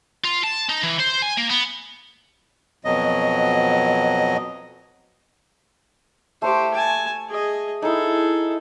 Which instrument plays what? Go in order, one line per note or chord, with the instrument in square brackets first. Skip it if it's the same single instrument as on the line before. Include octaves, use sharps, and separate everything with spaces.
[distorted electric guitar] F4
A5
D#4
E3
C5
G#5
A#3
B3
[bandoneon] F2 B2 F#3 D#5
[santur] A3 C#6 [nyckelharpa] G4 C5
[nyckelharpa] G#5 A5
G#4 D#5
[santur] D#4 E4 [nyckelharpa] G#4 A4